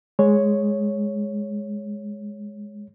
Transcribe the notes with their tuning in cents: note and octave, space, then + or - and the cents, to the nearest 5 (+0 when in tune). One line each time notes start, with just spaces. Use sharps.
G#3 +0 C#5 +0